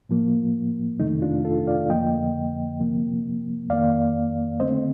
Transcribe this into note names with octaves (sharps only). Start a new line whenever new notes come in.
A2 F3 A#3
F2 C3 D#3 A3 D#4
D4 F4
F4 A4
D5 F5
F2 D3 F3 A#3 D#5 G5
C3 F3 A#3
F2 D#3 A#3 D5 F5
D3 A3 C4 C5 D#5